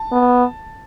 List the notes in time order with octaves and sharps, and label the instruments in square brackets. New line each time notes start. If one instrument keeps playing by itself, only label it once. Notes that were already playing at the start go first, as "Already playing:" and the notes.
Already playing: [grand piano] A5
[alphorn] B3